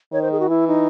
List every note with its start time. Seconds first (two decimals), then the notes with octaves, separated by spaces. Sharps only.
0.13 D#3 C#5
0.22 C5
0.32 G#4
0.40 F#4
0.49 E3 E4
0.68 D#4